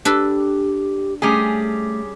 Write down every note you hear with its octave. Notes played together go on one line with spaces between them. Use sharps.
D4 G4 A4 B4
G3 A3 C#4 G#4